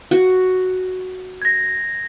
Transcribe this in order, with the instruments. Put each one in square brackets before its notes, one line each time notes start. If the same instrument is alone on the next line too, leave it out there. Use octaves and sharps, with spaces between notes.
[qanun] F#4
[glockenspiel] G#6 A#6